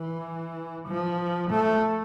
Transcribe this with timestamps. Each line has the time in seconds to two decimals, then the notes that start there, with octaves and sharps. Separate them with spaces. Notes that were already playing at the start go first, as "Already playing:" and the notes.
Already playing: E3
0.88 F3
1.50 A3